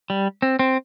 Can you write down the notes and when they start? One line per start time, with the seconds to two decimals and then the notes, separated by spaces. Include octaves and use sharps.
0.10 G3
0.42 C4
0.59 C4